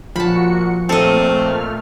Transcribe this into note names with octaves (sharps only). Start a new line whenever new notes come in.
A#2 F3 F#4 A5 B5 C#7
A#2 A3 C4 A4 D#5 F6